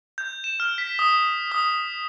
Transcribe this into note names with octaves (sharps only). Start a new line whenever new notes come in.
G6
E7
F6
B6
D#6
D#6